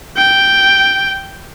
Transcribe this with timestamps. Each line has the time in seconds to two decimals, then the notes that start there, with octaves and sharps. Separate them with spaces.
0.17 G5